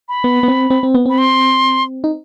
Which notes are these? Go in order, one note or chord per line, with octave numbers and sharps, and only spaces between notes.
B5
B3
B3
C4
C4
C4
B3
C4 B5
C6
D#4